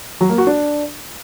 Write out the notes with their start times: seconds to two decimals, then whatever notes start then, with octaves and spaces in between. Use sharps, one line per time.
0.21 F#3
0.29 A#3
0.38 F#4
0.47 D4